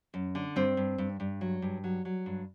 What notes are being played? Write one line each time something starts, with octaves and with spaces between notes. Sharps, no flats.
F#2
D3
G2 C4
G2
G2
G2
F#3
G2
F#3
F#3
G2